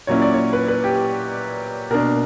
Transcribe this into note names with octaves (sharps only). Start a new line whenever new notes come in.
A#2 F#3 C#4 E4 C#5
D5
C#5
B4
B4
G4
B2 A#3 D4 A#4